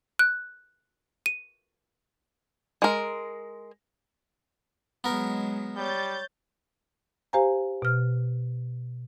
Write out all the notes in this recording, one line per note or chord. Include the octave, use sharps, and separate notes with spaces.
F#6
D#7
G#3 A#4
F#3 G#3 B3 A#4
G3 C#5 G6 A6
G4 C5 F5 G#5 A#5
B2 F6